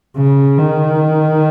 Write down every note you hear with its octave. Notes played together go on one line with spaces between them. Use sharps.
C#3
D#3